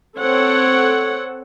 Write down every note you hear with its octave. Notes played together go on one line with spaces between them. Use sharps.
C4 A4 C#5 F#5